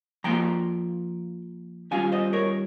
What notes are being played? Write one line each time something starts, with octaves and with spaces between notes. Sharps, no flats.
F3 A#3 F4 G5 A#5
D#3 G3 C#4 F4 F5 G#5
C5 D#5
A#4 C#5